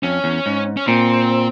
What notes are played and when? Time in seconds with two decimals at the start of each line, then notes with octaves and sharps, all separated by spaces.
0.03 F2 C#4
0.24 E2
0.46 G#2
0.77 C#4
0.87 A#2 C4